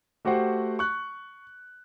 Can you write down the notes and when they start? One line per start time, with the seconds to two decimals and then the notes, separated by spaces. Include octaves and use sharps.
0.25 A3 F#4 G4 C5 F#5
0.79 C#6 F#6